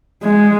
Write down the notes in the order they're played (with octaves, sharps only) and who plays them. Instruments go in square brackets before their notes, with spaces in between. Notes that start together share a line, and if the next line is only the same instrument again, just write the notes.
[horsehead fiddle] G#3